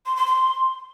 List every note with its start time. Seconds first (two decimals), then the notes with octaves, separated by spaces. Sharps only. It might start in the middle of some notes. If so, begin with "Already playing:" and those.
0.06 C6
0.16 C6
0.27 C6